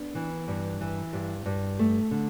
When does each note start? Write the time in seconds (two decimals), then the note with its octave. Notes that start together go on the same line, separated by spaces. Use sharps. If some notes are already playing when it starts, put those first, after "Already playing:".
Already playing: B3 D4
0.15 E3
0.48 G2
0.80 E3
1.13 G2
1.46 G2
1.79 A3
2.11 D3